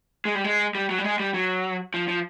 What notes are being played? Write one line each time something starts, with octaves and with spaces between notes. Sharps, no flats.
G#3
G3
G#3
G3
F#3
G3
G#3
G3
F#3
F3
F3